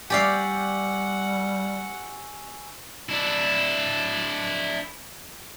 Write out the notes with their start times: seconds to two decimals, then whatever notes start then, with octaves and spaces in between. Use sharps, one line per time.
0.10 G3 G4 D5 F5 F#5 G#5 C#6 E6
3.09 D4 E4